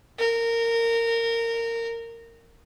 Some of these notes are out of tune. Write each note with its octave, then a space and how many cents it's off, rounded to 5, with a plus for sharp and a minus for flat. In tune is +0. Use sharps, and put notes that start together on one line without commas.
A#4 -20